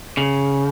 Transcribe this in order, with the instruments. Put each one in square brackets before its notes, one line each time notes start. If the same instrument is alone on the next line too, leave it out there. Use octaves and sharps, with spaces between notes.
[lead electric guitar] C#3